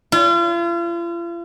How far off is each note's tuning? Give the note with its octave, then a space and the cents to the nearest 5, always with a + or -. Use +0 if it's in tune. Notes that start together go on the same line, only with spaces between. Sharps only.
F4 -40